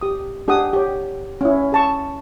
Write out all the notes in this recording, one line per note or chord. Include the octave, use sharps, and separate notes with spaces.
G4 D#6
D4 G4 G#4 F#5 D#6
G4 C#5
C#4 E4
G#4 A5 C#6